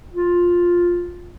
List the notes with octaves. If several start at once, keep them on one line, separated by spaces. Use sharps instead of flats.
F4